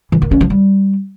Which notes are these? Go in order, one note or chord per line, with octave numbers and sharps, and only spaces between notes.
E3
D#3
C#4
F3
G3